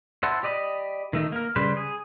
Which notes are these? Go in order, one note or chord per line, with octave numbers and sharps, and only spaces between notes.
E4 C5 F#5 A5
G4 D5 D#5 B5
D#3 A3 D#4
A#3 A#4
C#3 G3 B4 C5
G#4